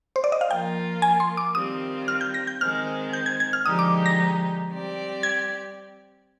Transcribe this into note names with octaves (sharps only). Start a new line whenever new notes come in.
C5
D5
D#5
F5
F3 A#3 F4 A#4 G5
G#5
C6
D6
D#3 G3 C4 F4 D#6
F6
G6
A#6
G6
D#3 G#3 C4 F6
G6
G#6
G#6
F6
D3 F3 G#3 D#4 G4 D#6
D6
A#6
G3 C4 G4 D5
G#6